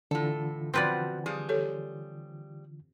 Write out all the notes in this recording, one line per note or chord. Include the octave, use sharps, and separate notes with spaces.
A2 D3 E3 F4 A4
B2 F3 C4 F#4 B4 D5
F3 G3 G#4
G4 A4 C#5